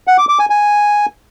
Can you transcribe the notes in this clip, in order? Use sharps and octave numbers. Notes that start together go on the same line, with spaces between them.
F#5
D6
D6
G#5
G#5